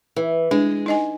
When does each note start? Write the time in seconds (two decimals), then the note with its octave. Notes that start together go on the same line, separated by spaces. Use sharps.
0.16 E3
0.51 G#3 D4
0.86 D#4 D#5 G#5